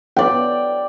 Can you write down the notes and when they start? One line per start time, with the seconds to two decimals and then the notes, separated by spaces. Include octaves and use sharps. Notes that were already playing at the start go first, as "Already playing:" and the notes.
0.16 D5 G5